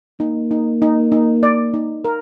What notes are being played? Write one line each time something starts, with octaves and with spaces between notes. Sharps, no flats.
A#3 D#4
D#4
D#4
D#4
D5
D#4
A#4